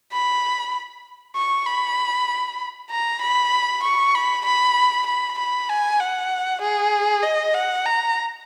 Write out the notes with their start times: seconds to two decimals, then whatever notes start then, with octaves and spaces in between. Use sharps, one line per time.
0.12 B5
1.35 C#6
1.66 B5
2.90 A#5
3.21 B5
3.83 C#6
4.15 B5
4.45 B5
5.06 B5
5.38 B5
5.69 G#5
6.00 F#5
6.61 G#4
7.23 D#5
7.54 F#5
7.86 A#5